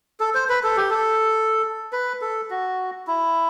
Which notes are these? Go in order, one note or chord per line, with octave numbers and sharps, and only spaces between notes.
A4
C5
B4
A4
G4
A4
B4
A4
F#4
E4